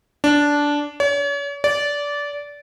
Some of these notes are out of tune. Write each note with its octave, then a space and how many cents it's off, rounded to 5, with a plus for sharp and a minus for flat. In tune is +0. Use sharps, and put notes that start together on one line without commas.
D4 -10
C#5 +40
D5 -20